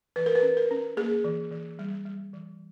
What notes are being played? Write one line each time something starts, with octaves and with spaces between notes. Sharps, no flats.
E3 B4
A#4
B4
C#4
A#4
C#4
A#3 G#4
E3
E3
G3
G3
E3